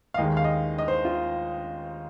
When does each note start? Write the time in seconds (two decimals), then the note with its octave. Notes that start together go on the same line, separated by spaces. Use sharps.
0.14 F5
0.17 D#2 D#3 G#3 D#5
0.37 F5
0.44 D#5
0.78 D#5
0.88 C5
1.05 F4